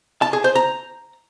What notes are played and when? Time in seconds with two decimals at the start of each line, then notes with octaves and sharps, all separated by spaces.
0.22 A5
0.33 G#4
0.44 C5
0.55 A#5